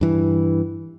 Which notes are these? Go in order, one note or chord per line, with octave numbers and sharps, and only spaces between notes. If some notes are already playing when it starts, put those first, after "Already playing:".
G2 E3